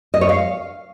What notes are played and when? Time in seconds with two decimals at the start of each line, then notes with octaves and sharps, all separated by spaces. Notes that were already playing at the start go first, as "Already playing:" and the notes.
0.14 D#5
0.21 C#5
0.29 F5